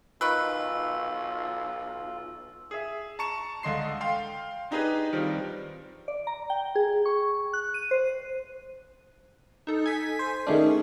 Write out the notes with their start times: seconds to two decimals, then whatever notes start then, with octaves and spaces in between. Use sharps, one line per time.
0.21 B1 D#3 F4 B4 E6
2.71 G#4 E5
3.19 A5 A#5 C#6 C#7 E7
3.63 C#2 D3 D#5 C6 C7
4.01 F5 G5 C6
4.71 D4 D#4 G4 G#4 B4 D#5
5.13 D#3 F3 G3 C4
6.08 D5
6.27 A#5
6.50 G5
6.75 G#4
7.06 C#6
7.53 F#6
7.74 D#7
7.91 C5
9.67 D#4 A4
9.86 G#5 G#6 B6
10.19 C5
10.47 D#3 A3 C#4 D4 G#4